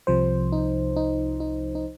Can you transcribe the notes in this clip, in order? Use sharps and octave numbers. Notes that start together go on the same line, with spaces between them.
C2 C3 F3 C5
D#4
D#4
D#4
D#4